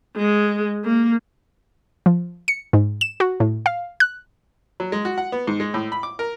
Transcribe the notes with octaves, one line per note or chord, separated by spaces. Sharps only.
G#3
A#3
F3
C#7
G#2
E7
F#4
A2
F5
F#6
F#3
G#3
F#4
F#5
B3
G#2
G#3
A2
B5
D6
A#4